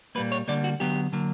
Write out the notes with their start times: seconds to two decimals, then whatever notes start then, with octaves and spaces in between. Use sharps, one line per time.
0.15 A#2 G3 A#3 B4
0.32 C#5
0.48 D3 G3 A#3 D5
0.64 F#4
0.80 D3 F#3 B3 G4
1.13 D3 F#3 A#3